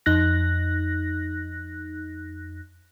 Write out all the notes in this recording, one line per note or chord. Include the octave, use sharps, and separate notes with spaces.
F2 D#4 F#6 A#6